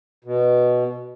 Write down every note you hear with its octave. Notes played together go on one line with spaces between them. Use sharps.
B2